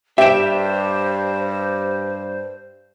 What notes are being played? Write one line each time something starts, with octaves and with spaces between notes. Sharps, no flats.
G2 G4 C5 E5 G5 E7